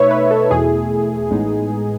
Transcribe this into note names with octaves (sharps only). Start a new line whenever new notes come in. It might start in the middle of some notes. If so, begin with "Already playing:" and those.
Already playing: B2 A3 D#4 B4 C#5 E5
B4
A4
E2 B2 A3 E4 G#4
A1 A2 G#3 B3 D#4